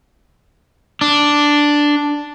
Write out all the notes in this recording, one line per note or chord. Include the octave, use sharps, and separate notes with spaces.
D4